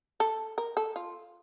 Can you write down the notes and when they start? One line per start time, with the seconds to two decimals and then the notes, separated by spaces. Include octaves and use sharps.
0.20 A4
0.58 A#4
0.77 A4
0.96 F4